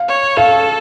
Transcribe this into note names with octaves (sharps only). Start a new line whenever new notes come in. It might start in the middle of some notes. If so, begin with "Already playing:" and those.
Already playing: F5
C#5
A4 F5